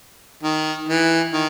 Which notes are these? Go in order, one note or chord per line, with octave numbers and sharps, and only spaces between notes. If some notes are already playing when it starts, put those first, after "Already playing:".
D#3
E3
D#3